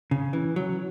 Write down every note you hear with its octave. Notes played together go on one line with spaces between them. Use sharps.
C#3
E3
F#3